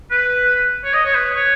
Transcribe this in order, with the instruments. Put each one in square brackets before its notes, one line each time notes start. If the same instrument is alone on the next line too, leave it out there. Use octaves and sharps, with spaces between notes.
[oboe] B4
C#5
D#5
C#5
B4
C#5